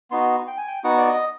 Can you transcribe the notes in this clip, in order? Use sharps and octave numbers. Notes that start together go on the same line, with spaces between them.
B3 D#4 F#4 C6
G5
G#5
G5
B3 D#4 F#4 F#5
D5
D#5